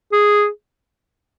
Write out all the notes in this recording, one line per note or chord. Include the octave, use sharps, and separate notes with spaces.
G#4